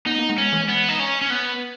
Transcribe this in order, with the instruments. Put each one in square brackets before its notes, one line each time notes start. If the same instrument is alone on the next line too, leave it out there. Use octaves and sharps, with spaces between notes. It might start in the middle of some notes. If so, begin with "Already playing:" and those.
[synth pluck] B3 [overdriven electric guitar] D#4
[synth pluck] A#3
G#3 B3
[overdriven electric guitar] C#4
[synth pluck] E3 G#3
[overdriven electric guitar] B3
D#4
C#4
C#4
B3